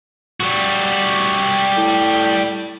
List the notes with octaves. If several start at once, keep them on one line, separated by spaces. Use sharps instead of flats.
G3 F#4
A2